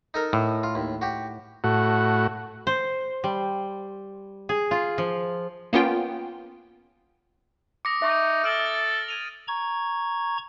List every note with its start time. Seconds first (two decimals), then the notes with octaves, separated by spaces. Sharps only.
0.14 D#4 A4 A#4
0.33 A2
0.63 F4
0.75 D#2
1.01 F#4 G4
1.64 A2 F#4
2.67 C5
3.24 G3
4.49 G#4
4.71 F4
4.98 F3
5.73 A#3 B3 C#4 F4 G5
7.85 D6 D#6 A#6 C#7
8.02 D#4 E5 C#6 D6 A#6
8.44 A4 F6 D7 F#7
8.66 A6
9.08 G#6 D#7 F7
9.48 A#5 C#6 G#6